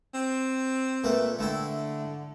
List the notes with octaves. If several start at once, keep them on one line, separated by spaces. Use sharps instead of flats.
C4
A#2 A3 B4
D3 A3 E4 G5